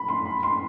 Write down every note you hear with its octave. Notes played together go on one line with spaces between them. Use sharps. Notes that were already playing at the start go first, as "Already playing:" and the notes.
Already playing: B5
C6
B5
C6